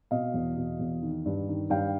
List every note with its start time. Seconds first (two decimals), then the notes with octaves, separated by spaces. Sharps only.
0.11 B2 D#5 F5
0.34 E2
0.57 B2
0.79 E2
1.02 D#3
1.26 G2
1.48 D#3
1.70 G2 F5 G5